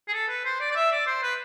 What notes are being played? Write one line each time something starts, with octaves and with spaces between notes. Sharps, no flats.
G#4
A4
B4
C5
D5
D5
E5
D5
C5
B4